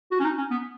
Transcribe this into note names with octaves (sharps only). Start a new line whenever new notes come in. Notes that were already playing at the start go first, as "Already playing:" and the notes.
F#4
C#4
D#4
C#4
B3